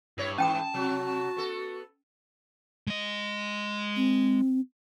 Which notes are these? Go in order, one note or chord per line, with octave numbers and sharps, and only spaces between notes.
G2 E4 C#5
G#2 E3 C#4 G5 A5 D#6
C3 F#3 F#4
B3 A4
G#3 D#5
C4